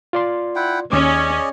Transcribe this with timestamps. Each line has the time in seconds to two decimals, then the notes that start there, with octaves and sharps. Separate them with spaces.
0.13 F4 D5 C6
0.56 E4 F#5 G5
0.92 D#2 C#4 G#4 D5 D#5 D6